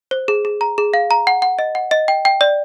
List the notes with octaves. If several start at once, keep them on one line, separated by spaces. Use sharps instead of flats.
C5
G#4
G#4
A#5
G#4
F5
A#5
F#5
F#5
D#5
F#5
D#5
G5
G5
D5